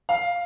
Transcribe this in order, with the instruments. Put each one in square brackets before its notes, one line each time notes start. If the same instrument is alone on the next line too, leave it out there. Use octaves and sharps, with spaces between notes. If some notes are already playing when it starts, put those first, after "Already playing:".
[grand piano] F5